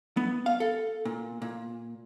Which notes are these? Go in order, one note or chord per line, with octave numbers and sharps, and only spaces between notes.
B3
F5
A4
A#2
A#2